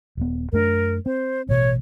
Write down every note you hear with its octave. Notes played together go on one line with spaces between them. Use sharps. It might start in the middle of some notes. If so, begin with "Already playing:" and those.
D#1 B3
F#2 A3 D4 A#4
C4 C5
A1 B2 C#5